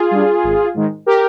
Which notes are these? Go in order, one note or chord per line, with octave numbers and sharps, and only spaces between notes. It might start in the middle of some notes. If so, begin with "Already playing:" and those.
Already playing: F4 G#4
G3 D4
G#1
G#2 D#3 G#3
G4 A#4